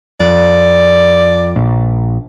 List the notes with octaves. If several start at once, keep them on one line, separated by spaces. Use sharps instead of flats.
F2 D5
A#1